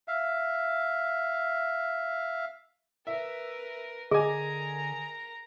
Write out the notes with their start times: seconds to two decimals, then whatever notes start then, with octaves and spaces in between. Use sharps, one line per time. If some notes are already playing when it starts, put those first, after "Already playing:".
0.08 E5 F5
3.07 A#4 B4 E5
4.11 D3 G#4 A#4 D#5 G#5 A#5